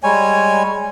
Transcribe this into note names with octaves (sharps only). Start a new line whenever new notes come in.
G3 G#3 C#5 G#5